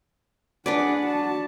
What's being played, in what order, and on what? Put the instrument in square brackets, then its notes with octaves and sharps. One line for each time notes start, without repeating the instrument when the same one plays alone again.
[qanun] D4 B4 D5 [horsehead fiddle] G#4 F#5
[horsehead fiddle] F#4 A5